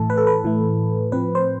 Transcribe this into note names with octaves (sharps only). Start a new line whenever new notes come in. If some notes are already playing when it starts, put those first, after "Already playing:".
Already playing: A2 E3 A3 A4
B4
A4
B4
A2 E3 A3
A2 F3 C4 B4
C5